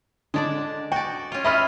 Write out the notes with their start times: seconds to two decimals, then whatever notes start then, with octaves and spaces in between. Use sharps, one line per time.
0.34 D3 G#3 D4 D5
0.92 F#4 D5 G5
1.32 C#4 F4
1.44 E4 F4 D#5 E5 B5 F6